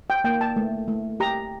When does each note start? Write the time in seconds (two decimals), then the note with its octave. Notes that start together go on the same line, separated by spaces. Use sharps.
0.10 G5
0.24 A#3 G5
0.41 A5
0.56 A3
0.88 A3
1.20 G4 A#5